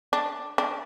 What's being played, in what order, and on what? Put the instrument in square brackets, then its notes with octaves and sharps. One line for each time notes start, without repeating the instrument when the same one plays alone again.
[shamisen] D4
D4